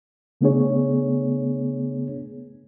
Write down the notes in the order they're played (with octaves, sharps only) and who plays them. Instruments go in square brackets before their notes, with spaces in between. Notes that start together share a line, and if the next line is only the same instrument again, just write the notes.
[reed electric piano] C#3 A3 B3 D4 G#4 C#5